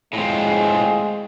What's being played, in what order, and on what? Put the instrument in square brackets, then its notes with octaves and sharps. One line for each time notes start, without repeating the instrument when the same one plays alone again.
[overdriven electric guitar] A2 C4 [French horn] G#3 [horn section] F4 G#4